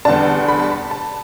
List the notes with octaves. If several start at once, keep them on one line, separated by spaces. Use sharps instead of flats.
E2 D3 G3 D4 A5
B5
A5
B5
A5